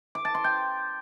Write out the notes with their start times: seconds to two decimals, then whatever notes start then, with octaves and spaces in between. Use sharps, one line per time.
0.15 D6
0.25 A5
0.35 C6
0.44 G5